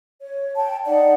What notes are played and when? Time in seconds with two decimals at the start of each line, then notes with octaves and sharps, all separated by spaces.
0.20 C#5
0.56 G5 A5
0.85 D#4 D5 F#5